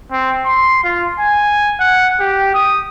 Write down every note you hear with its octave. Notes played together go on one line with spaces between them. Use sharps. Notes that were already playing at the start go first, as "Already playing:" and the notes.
C4
C6
F4
G#5
F#5
G4
D#6